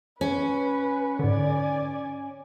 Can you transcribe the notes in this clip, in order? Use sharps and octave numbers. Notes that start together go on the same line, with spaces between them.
C#4 B4
G#2 D3 D5 G#5